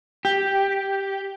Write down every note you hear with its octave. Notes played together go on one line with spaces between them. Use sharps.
G4